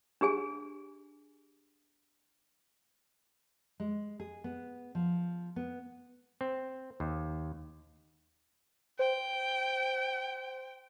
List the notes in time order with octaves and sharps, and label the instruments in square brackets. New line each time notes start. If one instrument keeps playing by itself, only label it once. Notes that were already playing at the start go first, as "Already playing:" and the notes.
[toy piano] D4 G4 G#4 G#5
[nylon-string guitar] G#3
G#4
B3
F3
B3
[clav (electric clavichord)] C4
D#2
[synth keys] C5 [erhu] G5